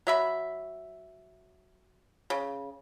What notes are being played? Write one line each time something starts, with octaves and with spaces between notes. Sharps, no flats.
F#3 E5 B5
C#3